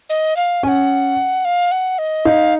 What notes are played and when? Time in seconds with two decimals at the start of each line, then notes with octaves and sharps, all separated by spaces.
0.10 D#5
0.37 F5
0.63 C#4 G#5
0.68 F#5
1.45 F5
1.72 F#5
1.99 D#5
2.25 D#4 F5